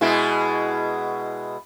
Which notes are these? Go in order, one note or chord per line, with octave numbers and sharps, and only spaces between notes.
B2 G#3 E4